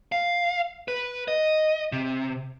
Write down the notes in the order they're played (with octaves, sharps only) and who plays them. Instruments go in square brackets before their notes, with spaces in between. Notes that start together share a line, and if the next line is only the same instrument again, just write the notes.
[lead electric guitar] F5
B4
D#5
C3